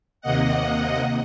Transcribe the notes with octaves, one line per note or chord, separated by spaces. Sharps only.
D#2 C3 A#3 D#5 F#5